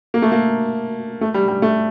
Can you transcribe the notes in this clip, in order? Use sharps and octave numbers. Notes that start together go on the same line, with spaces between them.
A#3
A3
A#3
A3
G3
G3
A3